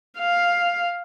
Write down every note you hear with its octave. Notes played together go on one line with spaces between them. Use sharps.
F5